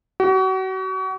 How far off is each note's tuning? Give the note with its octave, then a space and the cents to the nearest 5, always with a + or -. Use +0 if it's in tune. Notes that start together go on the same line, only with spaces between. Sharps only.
F#4 +35